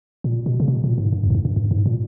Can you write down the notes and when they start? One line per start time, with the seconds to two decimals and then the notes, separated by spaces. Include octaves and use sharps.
0.24 A#2
0.46 B2
0.60 C#3
0.68 B2
0.84 A#2
0.98 G#2
1.13 G2
1.24 E2
1.30 G#2
1.35 G2
1.45 G2
1.56 G2
1.71 G#2
1.86 A#2